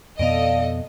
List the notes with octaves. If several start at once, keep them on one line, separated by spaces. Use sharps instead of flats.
F2 B2 B3 A4 D5 D#5 F5